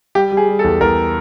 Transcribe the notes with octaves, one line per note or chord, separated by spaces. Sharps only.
G3 G4
G3
G#4
G3
A4
E2
E2 A#4